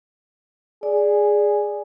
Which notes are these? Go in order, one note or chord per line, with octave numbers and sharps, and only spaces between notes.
G#4 D5